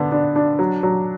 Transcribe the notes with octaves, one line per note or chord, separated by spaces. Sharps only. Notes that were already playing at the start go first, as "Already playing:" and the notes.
Already playing: D3 B3 D4
D4
D4
F#3
F#3